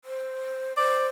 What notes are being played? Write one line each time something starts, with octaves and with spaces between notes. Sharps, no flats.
C5
C5 D5